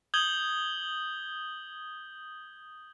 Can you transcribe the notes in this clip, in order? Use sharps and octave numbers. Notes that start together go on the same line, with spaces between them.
D#6 G6 G#6 F#7 G7